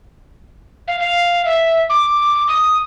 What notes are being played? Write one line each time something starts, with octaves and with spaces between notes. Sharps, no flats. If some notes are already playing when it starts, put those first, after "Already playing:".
F5
F5
E5
D6
D#6